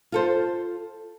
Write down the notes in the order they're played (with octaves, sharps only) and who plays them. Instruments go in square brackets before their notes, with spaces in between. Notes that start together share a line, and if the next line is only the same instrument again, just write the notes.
[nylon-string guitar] F4 A4 C5